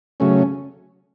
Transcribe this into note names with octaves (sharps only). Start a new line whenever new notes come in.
C#3 F#3 A3 C#4